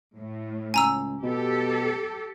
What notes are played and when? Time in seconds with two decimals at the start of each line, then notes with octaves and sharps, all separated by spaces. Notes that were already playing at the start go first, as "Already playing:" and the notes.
0.16 A2
0.74 C#2 G#5 A#5 E6
1.23 B2 G4 A4